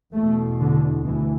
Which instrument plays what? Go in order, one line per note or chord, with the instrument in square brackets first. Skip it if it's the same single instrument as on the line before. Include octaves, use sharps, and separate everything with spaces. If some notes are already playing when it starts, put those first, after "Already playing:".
[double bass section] E2 B2 A3
D3
D2 E3